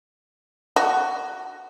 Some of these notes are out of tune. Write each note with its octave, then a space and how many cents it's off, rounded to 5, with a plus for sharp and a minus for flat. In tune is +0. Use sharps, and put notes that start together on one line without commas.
F#4 +10